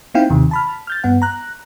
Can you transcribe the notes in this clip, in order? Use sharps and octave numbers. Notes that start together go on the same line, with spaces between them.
A#3 C4 D#4 E4 F5 G5
D#2 C3 D#3
A5 B5 F6
F6 G6 A6
G2 B3 F#5
A#5 F#6